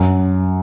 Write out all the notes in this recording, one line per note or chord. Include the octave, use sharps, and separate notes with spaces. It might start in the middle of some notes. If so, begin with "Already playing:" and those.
Already playing: F#2